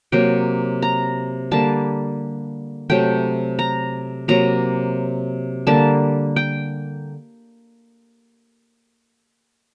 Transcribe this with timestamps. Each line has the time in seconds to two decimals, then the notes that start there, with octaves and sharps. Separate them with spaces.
0.12 C3 F#3 A#3 G5
0.82 A#5
1.51 D3 G3 A#3 A5
2.90 C3 F#3 A3 G5
3.59 A#5
4.28 C3 F#3 A#3 A#5
5.67 D3 G3 A#3 A5
6.36 G5